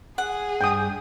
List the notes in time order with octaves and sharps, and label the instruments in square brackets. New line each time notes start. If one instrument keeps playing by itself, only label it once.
[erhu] G#4 [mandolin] F#5
[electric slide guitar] G2 D4 G#5 [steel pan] G5 D#6